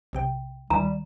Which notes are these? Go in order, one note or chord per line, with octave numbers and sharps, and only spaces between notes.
B1 C3 G5
D2 D#3 G3 A#5